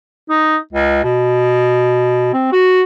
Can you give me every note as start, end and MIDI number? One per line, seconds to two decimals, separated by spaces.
0.29 0.57 63
0.73 1.03 37
1.04 2.31 47
2.33 2.48 60
2.52 2.82 66